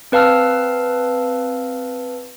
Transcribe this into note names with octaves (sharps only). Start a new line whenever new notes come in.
C4 B4 F5 A5 E6 F6